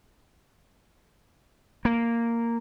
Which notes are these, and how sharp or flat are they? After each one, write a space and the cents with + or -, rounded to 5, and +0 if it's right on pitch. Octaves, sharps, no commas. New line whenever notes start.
A#3 -5